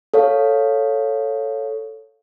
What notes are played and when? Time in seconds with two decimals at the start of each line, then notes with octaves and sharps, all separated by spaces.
0.14 A4 C#5 F5